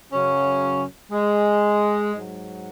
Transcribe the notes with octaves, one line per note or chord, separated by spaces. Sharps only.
F#2 C#3 F#3 C#4
G#3
G#2 F#3